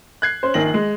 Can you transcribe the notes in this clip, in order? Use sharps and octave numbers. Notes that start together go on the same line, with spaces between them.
F#6 G#6 C7
C#4 C5
A#1 D#3 A#6 F#7
G#3